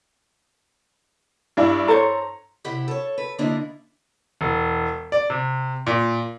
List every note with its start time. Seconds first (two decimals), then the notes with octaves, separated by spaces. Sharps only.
1.57 G2 D4 E4
1.88 A4 C5 C#5 A#5
2.64 C3 E4 G4 F#5
2.88 A4 C#5
3.18 B4
3.38 D3 A#3 D4 E4 F4 D#5
4.41 E1
5.12 D5
5.30 C3
5.87 A#2